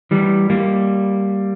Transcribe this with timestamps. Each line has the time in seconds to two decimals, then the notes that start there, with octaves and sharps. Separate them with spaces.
0.11 E3 G3
0.50 G3 A#3